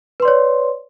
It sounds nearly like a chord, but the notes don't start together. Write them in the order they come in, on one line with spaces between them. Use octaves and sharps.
B4 C6 D5 C#5